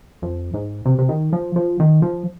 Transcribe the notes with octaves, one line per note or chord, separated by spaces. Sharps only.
F2
G#2
C3
C3
D#3
F3
F3
D#3
F3